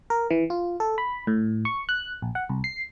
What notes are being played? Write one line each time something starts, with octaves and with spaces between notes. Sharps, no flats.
A#4
E3
F4
A4
B5
A2
C#6
F#6
A#1
F#5
C2
C7